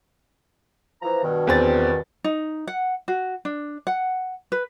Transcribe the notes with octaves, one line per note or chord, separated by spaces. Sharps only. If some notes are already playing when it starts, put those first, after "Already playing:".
E3 F3 A#5
G2 B2 D#3
E2 C4 A6
D#4
F#5
F#4
D4
F#5
B4